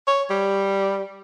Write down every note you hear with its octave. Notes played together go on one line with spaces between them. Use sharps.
C#5
G3